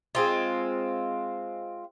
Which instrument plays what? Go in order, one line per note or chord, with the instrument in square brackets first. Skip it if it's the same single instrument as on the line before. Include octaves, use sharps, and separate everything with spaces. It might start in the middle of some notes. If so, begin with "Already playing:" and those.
[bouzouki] G#3 C4 F4